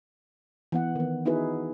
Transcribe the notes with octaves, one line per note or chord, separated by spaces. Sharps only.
E3 B3 F#5
D#3 B3
B3 D#4 E4 F#4 G#4 B4